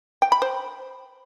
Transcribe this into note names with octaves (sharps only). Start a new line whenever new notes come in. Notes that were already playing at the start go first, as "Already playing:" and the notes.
G5
B5
C5